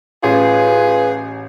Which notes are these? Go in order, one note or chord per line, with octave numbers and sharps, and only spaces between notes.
A1 F4 G#4 B4